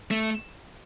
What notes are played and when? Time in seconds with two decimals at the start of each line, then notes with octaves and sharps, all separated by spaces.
0.11 A3